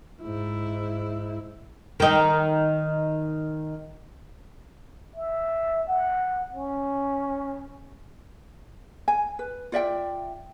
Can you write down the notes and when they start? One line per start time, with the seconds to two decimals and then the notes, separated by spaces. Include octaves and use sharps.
0.22 G#2 E4
2.00 D#3 D#4
5.16 E5
5.88 F#5
6.54 C#4
9.08 G#5
9.39 B4
9.72 F4 D5 E5 G5